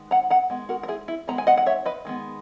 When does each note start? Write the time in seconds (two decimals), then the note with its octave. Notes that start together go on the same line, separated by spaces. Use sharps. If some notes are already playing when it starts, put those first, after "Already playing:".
Already playing: D#3 G#3 B3
0.11 F#5 A#5
0.30 F#5 A#5
0.50 D#3 G#3 B3
0.69 F#4 A#4
0.83 A#4
0.88 E4 G#4
1.08 E4
1.28 D#3 G#3 B3 A#5
1.38 G#5
1.47 D#5 F#5
1.57 F#5
1.66 C#5 E5
1.85 B4 D#5
2.05 D#3 G#3 B3